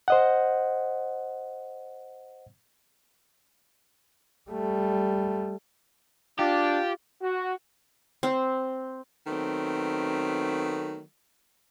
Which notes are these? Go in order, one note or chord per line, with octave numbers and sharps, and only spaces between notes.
C5 D#5 F#5
G3 A3
D4 F4 G4
F#4
C4
D#3 F#3 A3 B3 C4